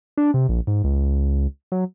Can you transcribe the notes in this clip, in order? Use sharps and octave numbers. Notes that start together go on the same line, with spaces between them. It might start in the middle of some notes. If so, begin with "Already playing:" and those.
D4
C3
A#1
G#2
C#2
F#3